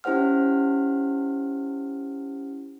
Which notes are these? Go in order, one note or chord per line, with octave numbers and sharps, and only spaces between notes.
C#4 E4 G4 C5 F#5 F6